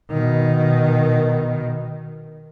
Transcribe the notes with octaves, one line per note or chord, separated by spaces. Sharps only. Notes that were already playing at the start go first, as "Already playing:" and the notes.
B2 D#3